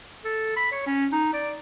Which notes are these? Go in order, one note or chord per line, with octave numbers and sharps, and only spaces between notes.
A4
B5
C#5
C#4
D#4
D5